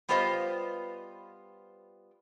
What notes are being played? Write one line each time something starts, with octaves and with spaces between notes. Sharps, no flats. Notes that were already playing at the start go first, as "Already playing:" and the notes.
G3 B3 F4 G4 C5 D#5